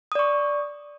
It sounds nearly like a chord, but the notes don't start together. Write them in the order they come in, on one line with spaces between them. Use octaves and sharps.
D#6 D5 C#6